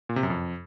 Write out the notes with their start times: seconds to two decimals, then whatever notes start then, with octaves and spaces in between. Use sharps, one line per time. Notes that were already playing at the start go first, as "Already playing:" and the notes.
0.09 A#2
0.16 C3
0.23 F#2
0.30 F2